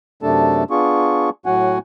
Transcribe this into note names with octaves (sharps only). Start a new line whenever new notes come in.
F#2 C3 A3 D4 A4 A5
B3 D4 F4 G#4 C#6
A2 F#3 F#4 F#5 G#5